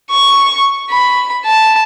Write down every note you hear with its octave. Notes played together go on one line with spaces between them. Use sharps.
C#6
B5
A5